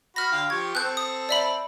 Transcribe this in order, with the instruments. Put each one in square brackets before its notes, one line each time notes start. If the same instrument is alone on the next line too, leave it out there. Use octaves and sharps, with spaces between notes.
[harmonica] F#4 B5 [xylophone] F6 A#6
[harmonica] D3 F5 G5
[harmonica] F3 G4 C#6 [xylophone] G#6
[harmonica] C4 A4 [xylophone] F#6 G6
[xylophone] D#6
D5 E5 B5